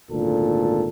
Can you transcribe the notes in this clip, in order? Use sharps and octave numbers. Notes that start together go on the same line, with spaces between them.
G#1 D2 A#2 A4